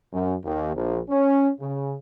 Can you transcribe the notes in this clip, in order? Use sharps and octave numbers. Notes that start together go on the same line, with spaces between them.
F#2
D#2
A#1
C#4
C#3